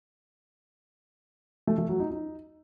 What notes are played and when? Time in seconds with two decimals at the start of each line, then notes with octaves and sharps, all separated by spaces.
1.67 A3
1.78 A3
1.89 F#3
2.00 D#4
2.11 D#4